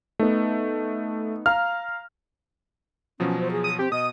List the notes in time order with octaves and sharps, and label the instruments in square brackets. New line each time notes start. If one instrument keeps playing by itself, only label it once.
[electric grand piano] A3 [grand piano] B3 D#4
[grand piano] F5 A#5 [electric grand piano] F6
[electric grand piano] B2 F3 F#3 [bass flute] C#4
[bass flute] C5
G#4
[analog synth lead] D#6
[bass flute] C4 [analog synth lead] G4
[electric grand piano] B2 [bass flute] D#5 [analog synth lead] D#6